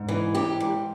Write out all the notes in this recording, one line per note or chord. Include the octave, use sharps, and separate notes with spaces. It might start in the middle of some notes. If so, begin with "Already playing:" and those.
Already playing: G#2
E3
G#2 G4
G#2